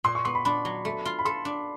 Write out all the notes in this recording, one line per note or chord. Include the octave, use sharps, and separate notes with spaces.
A#2 C6
C#6
B3 C6
B5
D4 B5
F#3
A3
F4
B5
A4 C6
D4